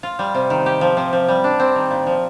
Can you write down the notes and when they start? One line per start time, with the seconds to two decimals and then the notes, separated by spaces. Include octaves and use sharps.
0.03 F4
0.19 G3
0.35 C3
0.50 D#3
0.66 G4
0.81 F3
0.97 C3
1.13 F3
1.29 G3
1.44 D4
1.60 C4
1.76 D#3
1.91 A#2
2.06 F3